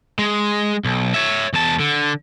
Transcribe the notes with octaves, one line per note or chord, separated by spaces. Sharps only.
G#3
B1
C#5 E5
E2 A5
D3